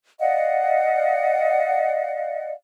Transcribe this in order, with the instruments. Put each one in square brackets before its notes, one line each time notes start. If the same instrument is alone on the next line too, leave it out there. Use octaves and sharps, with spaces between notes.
[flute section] D5 D#5 F5 F#5